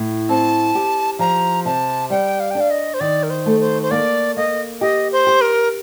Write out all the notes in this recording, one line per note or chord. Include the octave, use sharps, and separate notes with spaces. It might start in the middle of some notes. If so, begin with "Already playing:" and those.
Already playing: A2
C4 A5
G4
F3 A#5
C3 A5
G3 G5
F5
D4 G5
F5
D#5
C5
D#3 D5
A#4
C5
A3
C5
C5
A#3 D5
A#3 D#5
G4 D#5
C5
G4
A#4